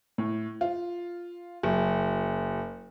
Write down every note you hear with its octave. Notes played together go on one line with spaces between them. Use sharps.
A2
F4
F#1